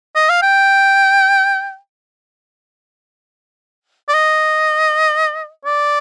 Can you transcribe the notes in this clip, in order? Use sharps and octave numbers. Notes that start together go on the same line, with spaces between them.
D#5
F5
G5
D5
D#5
D5